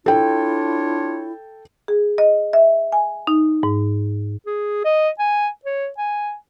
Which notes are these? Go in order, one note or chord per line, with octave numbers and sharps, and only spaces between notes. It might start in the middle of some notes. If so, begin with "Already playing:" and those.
D4 E4 F4 A4 C#5 G5
G#4
D#5
E5
G#5
D#4
G#2
G#4
D#5
G#5
C#5
G#5